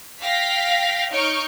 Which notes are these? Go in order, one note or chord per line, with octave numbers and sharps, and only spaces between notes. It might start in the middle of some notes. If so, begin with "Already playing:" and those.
F5 G5 A#6 B6
D#4 C#5 C#6 F6 G6 D7